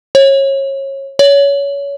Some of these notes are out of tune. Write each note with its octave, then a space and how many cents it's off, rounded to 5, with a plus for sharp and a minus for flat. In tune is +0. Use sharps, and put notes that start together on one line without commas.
C#5 -25
C#5 +25